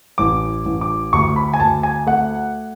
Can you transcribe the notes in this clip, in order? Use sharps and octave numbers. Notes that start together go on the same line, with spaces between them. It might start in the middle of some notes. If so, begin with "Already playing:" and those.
A1 D6
A1
D6
D2 C#6
B5
G#5
D2 A5
G#5
A3 F#5